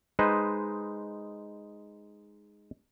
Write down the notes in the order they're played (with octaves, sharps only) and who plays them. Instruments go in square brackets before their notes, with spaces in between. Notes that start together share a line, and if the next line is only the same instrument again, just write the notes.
[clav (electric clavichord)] G#3 D#4 B4 C5